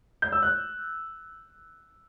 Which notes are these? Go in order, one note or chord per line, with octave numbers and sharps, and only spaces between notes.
G6
E6
F#6